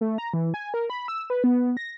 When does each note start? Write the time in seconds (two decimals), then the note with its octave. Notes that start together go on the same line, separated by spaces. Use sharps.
0.01 A3
0.18 A#5
0.34 E3
0.54 G#5
0.74 A#4
0.90 B5
1.08 E6
1.30 B4
1.44 B3
1.77 A#6